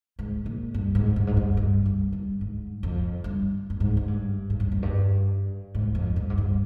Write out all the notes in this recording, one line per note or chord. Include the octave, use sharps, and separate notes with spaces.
G#2
A#2
G2
G#2
G2
G#2
G2
G2
G2
G2
G#2
F2
G2
G2
G#2
G#2
G2
G#2
G2
F2
G2
G#2
F2
G2
G#2
G2